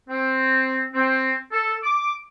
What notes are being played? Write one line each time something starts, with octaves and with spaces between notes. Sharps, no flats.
C4
C4
A4
D6